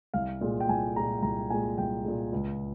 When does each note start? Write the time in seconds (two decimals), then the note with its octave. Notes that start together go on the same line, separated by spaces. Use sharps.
0.14 C2 F5
0.41 A#2 G#3
0.60 G5
0.69 C2 G#5
0.96 G#3 A#5
1.00 A#2
1.23 C2 A#5
1.50 A#2 G#3 G#5
1.78 C2 G5
2.05 A#2 G#3
2.33 C#2